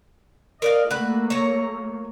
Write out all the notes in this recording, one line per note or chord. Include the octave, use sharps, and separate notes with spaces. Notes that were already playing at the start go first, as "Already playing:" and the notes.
A#4 D5 D#5 F5
A3 A#3 F#4 B4
F#3 C#5 A#5